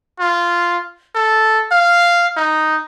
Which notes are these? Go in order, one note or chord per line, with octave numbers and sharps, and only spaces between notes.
F4
A4
F5
D#4